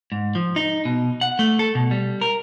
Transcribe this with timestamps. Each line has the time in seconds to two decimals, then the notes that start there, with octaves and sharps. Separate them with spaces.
0.12 G#2
0.35 F3
0.56 D#4
0.85 B2
1.21 F#5
1.39 A3
1.59 A4
1.75 B2
1.91 G3
2.21 A#4